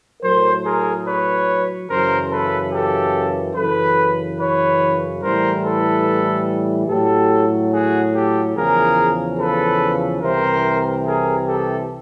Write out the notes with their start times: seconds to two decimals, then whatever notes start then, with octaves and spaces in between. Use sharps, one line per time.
0.22 A2 F#3 A#4 C5
0.63 G#4 A#4
1.06 B4 C#5
1.89 F#2 C#3 E3 A#4 C5
2.30 A4 B4
2.72 G4 A4
3.55 F#2 C#3 E3 A4 B4
4.39 B4 C#5
5.22 A2 E3 G3 A#4 C5
5.64 A4 B4
6.89 A2 F#3 G4 A4
7.72 F#4 G#4
8.14 G4 A4
8.55 E2 C#3 F3 G#4 A#4
9.38 A4 B4
10.22 C2 C3 E3 A#4 C5
11.05 G#4 A#4
11.47 G4 A4